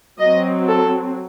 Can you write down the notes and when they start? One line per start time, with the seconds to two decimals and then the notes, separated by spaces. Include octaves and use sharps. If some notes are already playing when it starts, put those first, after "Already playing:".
0.19 F#3 C4 D#5
0.67 A4